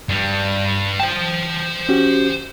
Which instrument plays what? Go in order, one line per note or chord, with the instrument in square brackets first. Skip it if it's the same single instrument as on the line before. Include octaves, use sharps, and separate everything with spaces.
[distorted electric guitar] G2 G3
[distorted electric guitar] C5 A5 [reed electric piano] G5
[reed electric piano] C#4 F#4 G4